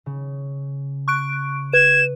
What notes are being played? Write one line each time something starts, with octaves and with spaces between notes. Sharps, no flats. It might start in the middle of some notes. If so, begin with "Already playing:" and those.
C#3
C#6 F#6 D7
B4 G#6 E7